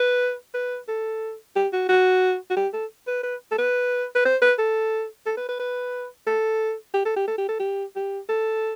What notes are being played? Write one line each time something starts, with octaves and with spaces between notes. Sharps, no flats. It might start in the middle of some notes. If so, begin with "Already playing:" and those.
Already playing: B4
B4
A4
G4
F#4
F#4
F#4
G4
A4
B4
B4
A4
B4
B4
C5
B4
A4
A4
B4
B4
B4
A4
G4
A4
G4
A4
G4
A4
G4
G4
A4